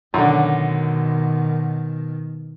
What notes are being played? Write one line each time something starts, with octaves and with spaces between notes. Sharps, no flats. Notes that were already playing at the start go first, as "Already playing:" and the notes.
F#2 B2 D3 D#3